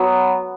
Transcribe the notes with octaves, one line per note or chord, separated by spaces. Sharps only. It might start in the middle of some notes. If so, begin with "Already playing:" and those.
Already playing: F#3 B3